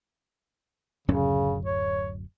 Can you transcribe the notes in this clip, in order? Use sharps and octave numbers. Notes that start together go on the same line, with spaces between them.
D1 F#2 C#3 C#4
C#5